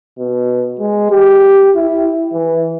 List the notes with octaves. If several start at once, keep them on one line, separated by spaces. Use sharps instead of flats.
B2
G#3
G4
E4
E3